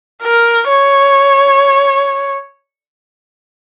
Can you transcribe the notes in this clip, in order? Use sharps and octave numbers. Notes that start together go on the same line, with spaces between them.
A#4
C#5